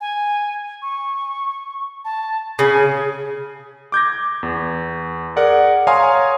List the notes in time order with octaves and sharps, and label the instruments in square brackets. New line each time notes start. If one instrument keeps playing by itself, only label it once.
[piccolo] G#5
C#6
A5
[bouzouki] C#3 [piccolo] G#5
[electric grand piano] D6 G6 G#6 A#6
E2
G#4 A#4 D5 F#5
C#5 F5 G#5 A#5 C6 D#6